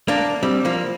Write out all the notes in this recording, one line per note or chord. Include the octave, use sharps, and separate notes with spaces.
A#3 D4
G3 C4
F3 A#3